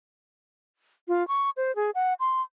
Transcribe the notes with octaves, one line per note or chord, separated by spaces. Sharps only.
F4
C#6
C5
G#4
F#5
C6